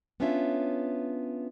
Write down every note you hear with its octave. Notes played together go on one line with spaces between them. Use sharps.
B3 C#4 D4 F4 C#5 E5